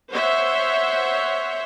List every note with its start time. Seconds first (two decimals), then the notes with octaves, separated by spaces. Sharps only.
0.10 C5 C#5 E5 F#5